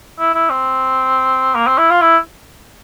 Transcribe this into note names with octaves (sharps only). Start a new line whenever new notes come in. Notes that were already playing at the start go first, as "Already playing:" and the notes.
E4
E4
C4
A#3
C4
E4
F4
E4